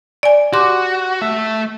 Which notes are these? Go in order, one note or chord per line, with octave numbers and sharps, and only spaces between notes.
D5 G#5
F#4 G4 C6 D6
A3 E5